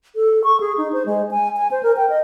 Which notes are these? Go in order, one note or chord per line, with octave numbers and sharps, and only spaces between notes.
A4
C#6
G#4
D#4
C5
G#3
G#5
G#5
C5
A#4
G5
D#5